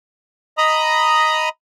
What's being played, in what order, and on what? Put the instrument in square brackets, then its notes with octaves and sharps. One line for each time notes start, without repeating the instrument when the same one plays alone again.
[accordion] D#5 A#5 B5 D#6